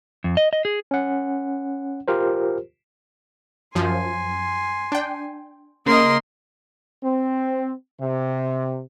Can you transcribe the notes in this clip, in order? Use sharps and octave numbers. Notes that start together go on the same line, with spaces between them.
F2
D#5
D#5
G#4
C#4 F#5
F4 G4 A#4 C5
F#2 F3 G#5 C6
D4 G5
C#3 A#3 A#4 D#5 C6
C4
C3